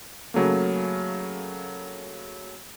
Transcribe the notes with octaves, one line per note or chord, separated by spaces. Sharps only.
C#3 F#3 A3 A#3